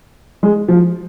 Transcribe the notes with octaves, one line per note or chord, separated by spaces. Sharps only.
G#3
F3